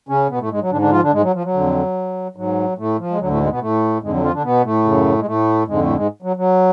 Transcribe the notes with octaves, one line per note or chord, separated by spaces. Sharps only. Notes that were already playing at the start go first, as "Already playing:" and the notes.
C#3 C#4
B2 B3
A2 A3
G#2 G#3
F#3
G#2 D3 D4
D3 D4
F3 F4
D3 D4
G#2 G#3
F#3
F3
F#3
F2 D3
G#2 F#3
A2 A3
F3
G#3
D2 D3 F#3
A2 A3
G#2 G#3
B2 B3
A2 A3
F2 G#2 D3 G#3
F#3
F3 F4
D3 D4
B2 B3
A2 A3
F#2 C#3
G#3
A2 A3
F2 G#2 D3 G#3
A2 A3
G#2 G#3
F#3
F#3